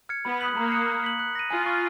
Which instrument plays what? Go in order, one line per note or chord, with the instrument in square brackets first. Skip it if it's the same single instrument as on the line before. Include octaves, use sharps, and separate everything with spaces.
[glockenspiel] F6 G#6 C#7
[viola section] B3 [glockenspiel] B5
[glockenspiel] D#6 F#6 B6 F#7
[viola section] A#3 [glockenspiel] A#5
[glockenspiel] D#6 F#6 C#7
F#6
B6 F#7
F#6
A#6 D#7
[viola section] F4 [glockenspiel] G#5
[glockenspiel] C#6 F6